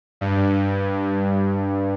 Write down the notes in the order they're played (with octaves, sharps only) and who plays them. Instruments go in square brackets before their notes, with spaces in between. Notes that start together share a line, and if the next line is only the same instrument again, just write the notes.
[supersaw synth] G2